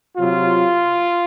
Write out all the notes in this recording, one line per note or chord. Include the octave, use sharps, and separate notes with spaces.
C3 F#3 F4